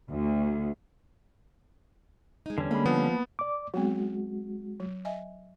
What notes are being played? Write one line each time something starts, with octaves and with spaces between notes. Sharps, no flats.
D2
G#3 D#4
E2 D3 G3 C#4
G#3 A#3 B5
F3 B3
D5 D6
F#3 G#3 B3 C4 F#4
F#3
D#5 E5 G#5